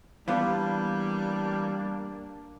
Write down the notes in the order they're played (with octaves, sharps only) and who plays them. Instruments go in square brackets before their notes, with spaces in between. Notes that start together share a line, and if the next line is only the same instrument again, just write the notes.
[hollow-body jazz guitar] E3 B3 [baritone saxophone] G3 [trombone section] A#3 D4 [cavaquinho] F4 D6